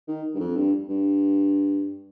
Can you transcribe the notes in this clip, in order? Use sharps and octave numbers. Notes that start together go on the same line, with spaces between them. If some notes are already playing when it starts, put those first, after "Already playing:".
D#3
G2
F2
G2
G2